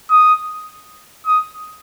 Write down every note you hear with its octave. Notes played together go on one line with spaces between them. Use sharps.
D#6
D#6